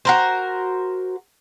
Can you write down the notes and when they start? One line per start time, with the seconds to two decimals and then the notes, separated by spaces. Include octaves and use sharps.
0.05 F#4 A#4 C5